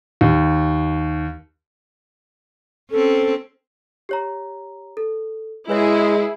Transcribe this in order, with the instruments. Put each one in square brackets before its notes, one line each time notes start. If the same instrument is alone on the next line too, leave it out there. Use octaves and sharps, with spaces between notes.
[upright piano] D#2
[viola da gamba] C4 C#4 [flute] A4
[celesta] G4 C#5 A#5
A4
[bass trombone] G#3 [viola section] E4 G#4 [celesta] B4 C#5 E5